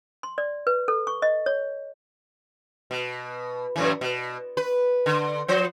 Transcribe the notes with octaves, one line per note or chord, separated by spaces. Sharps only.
C6
D5
B4
A4
C#6
D#5
C#5
B2
F#2 A2 E3
B2
B4
D3
F3 C5